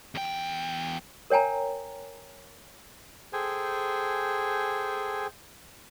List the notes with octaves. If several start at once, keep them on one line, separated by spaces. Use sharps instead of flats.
E2 G5
A#4 C#5 G5 G#5 A#5
G#4 A4 C5 G5 G#5